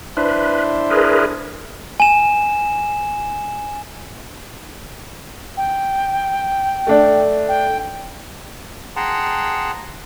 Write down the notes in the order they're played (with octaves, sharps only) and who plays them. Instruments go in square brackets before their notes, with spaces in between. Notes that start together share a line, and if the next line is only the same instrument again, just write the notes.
[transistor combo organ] D4 E4 C5 [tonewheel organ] B4
[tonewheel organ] G#4 A#4 B4
[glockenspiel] G#5 E7
[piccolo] G5
[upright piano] A3 D4
[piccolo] G5
[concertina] G#4 F#5 G5 A5 A#5 C6